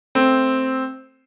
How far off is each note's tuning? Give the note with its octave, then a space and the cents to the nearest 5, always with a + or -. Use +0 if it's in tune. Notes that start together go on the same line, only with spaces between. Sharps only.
A3 +0 C4 +0